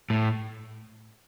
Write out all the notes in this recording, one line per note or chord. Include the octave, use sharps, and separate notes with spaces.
A2